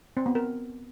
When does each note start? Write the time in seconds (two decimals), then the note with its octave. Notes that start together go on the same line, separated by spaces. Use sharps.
0.17 C4
0.26 B3
0.35 A#4